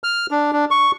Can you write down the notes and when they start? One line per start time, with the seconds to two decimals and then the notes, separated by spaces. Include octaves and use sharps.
0.04 F6
0.31 D4
0.53 D4
0.71 C#6